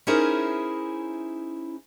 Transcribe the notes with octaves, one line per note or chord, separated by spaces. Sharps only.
C#4 D#4 E4 G#4 A#4 C5